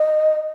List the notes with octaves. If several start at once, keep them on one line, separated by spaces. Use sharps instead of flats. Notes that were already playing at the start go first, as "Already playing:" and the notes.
Already playing: D#5